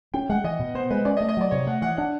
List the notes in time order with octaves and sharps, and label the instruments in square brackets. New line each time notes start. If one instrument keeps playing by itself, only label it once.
[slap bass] C#4 [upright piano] G5
[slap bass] G#3 [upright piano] F#5
[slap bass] E3 [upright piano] D#5
[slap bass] B2
[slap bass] B3 [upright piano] C5
[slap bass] G#3 [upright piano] B4
[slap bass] C#4 [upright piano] D5
[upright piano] D#5
[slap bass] A3
[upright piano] D#5
[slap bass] F#3 [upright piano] D5
[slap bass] C3 [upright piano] C#5
[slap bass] A3 [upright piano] F#5
[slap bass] E3 [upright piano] F#5
[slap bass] D4 [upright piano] F#5